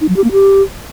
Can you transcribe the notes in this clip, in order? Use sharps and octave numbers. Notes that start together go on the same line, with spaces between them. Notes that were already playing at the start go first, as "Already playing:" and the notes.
D#4
F#3
G4
A#3
G4